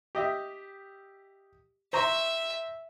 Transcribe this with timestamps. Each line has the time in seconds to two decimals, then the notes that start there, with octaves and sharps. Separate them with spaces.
0.15 G4 D#5 E5
1.93 C5 E5 A#5 C#6